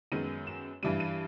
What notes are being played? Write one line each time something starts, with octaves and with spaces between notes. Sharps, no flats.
F#2 D#3 G#3 B3 D#7
E7
G2 E3 G3 D#7
D#7